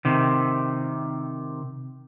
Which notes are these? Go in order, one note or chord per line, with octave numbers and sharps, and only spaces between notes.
C3 D#3